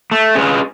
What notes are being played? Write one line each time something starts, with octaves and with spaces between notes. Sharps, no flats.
A3
C#4 G#4 B4